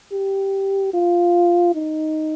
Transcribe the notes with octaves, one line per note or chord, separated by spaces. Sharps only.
G4
F4
D#4